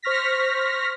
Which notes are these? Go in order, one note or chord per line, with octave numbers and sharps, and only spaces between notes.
C5 C#6 F6 A#6 B6